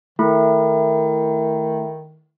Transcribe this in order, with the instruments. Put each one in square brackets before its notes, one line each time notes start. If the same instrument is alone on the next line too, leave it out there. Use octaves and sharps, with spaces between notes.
[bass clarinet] D#3 [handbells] A3 E4